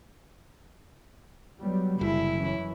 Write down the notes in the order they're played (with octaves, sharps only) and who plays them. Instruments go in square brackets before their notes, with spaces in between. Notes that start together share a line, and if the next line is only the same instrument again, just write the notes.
[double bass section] F#3 G3 B3
[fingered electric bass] F#1 [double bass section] C3 [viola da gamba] E4
[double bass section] F#2 E3 C#4